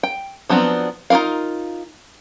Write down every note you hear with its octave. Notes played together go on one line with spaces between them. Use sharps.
G5
F3 F#3 B3 C4 D4
D#4 F4 F#4 A#4 F5